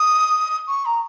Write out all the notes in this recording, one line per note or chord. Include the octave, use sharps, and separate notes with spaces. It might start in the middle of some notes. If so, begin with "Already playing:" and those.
Already playing: D#6
C#6
A#5